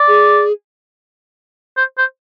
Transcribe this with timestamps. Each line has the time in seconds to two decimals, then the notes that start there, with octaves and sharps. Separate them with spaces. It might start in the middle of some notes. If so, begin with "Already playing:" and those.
Already playing: D5
0.08 G#4
1.77 C5
1.98 C5